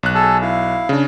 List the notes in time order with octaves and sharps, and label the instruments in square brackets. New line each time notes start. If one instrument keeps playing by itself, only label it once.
[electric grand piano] B1 F#6
[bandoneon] G#4 A4 A5
E4 F5
[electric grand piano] C#3 D4